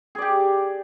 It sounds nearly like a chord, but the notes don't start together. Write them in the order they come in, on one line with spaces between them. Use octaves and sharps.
G#4 D5 G4